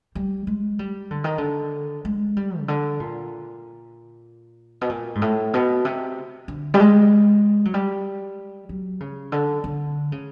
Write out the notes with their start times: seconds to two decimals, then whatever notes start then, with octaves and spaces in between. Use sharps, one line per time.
0.15 G3
0.47 G#3
0.79 G3
1.11 D3
1.24 D#3
1.38 D3
2.05 G#3
2.37 G3
2.59 C#3
2.68 D3
3.00 A#2
4.81 B2
4.89 A#2
5.15 G#2
5.22 A2
5.54 B2
5.85 C3
6.48 D3
6.74 G3
6.80 G#3
7.65 F#3
7.74 G3
8.69 F#3
9.00 C#3
9.32 D3
9.64 D3
10.12 C#3